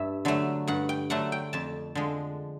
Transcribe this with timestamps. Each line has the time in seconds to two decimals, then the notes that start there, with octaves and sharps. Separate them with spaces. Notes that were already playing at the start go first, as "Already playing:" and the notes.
Already playing: G2 E5
0.25 D3 F#3 A3
0.67 G2 F#5
0.89 G5
1.10 D3 F#3 A3 F#5
1.32 G5
1.53 F2 A5
1.95 D3 F3 G#3